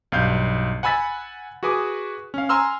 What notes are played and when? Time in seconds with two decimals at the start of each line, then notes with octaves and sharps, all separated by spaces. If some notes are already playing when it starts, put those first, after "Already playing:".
0.12 B1 G2 F5 G6
0.83 F#5 G#5 B5 E6 A6 B6
1.63 F#4 G#4 B4 G#5 D6 D#6
2.34 C#4 F5
2.49 G#5 A#5 C6 E6 F6